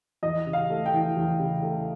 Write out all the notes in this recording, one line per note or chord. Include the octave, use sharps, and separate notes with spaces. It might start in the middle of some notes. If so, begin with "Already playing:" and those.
E2 D#5
C#3
F5
A3
G5
E3
E2
C#3
A3